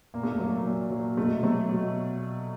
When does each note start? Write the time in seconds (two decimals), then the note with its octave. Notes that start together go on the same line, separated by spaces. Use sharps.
0.14 A#2 A#3
0.23 A3
0.32 A#3
0.39 F#3
0.65 A#2
0.91 F#3
1.17 B2 A3
1.43 F#3 A3
1.69 B2